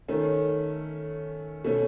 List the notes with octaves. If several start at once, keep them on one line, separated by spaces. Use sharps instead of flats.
D#3 A3 C#4
B2 A3 C#4